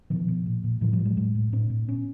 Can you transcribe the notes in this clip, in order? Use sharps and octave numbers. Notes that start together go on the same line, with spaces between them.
B2 D#3 F3
B2
A#2
A#2
A2 E3 F#3
F3 G3
A2
F#3 G#3
A2 F#3 G#3
A2
A2 C4 D4
A2
A#2 B3 C#4